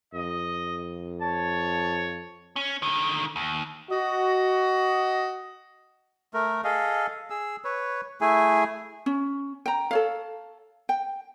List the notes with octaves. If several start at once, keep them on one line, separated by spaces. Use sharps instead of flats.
F2 D#5
C#5 A5
C#4
D3 D#3
D#2
F#4 D#5
A3 A#4
G#4 A4 D#5 F5
G#4 E6
B4 C#5
A3 E4 G#4 G#5
C#4
G5 A#5
A4 C#5 F5
G5